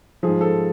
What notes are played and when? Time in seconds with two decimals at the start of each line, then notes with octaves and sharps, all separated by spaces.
0.23 G#2 F3 G#4
0.41 A4